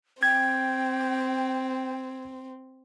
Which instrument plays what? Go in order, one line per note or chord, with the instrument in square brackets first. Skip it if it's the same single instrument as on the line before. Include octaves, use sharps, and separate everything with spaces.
[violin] C4 [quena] G5 [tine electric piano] G#6